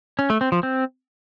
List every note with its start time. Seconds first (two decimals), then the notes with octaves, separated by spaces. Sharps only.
0.19 C#4
0.30 A3
0.41 C4
0.52 F3
0.63 C4